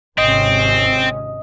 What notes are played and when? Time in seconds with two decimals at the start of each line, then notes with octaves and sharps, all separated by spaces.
0.18 G#1 C3 C4 C#4 D#5 D#6